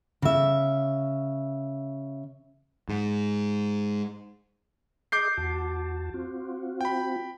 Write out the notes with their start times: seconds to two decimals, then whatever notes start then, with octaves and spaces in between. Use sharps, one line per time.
0.22 C#3 E5
2.89 G#2
5.12 G#4 D#5 D6 G6 C7
5.37 E2 F#4 A5
6.14 C4 F4 F#4
6.81 G5 B5